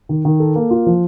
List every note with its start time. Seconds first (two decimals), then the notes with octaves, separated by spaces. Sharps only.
0.09 D#3
0.25 D#3
0.40 A4
0.56 A#3
0.71 F4
0.87 F3